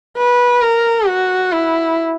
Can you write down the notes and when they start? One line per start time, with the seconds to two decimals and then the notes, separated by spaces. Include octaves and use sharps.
0.17 B4
0.62 A#4
1.07 F#4
1.52 E4